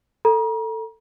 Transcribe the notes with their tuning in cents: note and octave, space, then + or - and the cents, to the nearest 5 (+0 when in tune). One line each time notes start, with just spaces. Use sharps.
A4 +15 A#5 +35